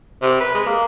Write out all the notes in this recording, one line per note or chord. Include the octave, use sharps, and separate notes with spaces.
C3
B4
G#3
A#3